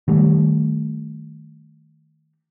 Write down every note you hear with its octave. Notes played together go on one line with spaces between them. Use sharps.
D#3 G3 A3